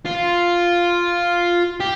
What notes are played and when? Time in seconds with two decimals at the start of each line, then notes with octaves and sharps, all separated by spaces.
0.06 F4
1.80 G4